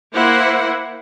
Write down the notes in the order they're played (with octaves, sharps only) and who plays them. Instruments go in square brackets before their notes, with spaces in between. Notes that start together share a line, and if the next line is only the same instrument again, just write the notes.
[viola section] A#3 E4 C5 F#5